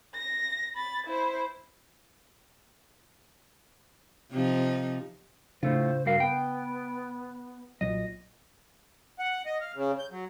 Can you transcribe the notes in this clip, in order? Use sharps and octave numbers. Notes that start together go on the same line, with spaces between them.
A#6
B5 A6
E4 C5
C3 F3 D#4
A2 C#3 A3 D4 F4 C5
G2 F#4 A#4 F5
B3 G5
B1 A#2 F#3 D#5
F#5
D#5
F5
C#3
G6
F#3